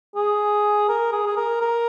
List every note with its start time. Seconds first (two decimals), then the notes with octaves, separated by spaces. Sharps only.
0.16 G#4
0.89 A#4
1.13 G#4
1.26 G#4
1.37 A#4
1.61 A#4